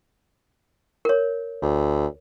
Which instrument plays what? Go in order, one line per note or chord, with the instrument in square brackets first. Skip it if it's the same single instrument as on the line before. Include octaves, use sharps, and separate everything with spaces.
[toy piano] A#4 C#5
[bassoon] D2